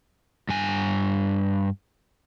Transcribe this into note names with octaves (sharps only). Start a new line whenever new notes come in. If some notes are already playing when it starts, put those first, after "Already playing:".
G2 G#5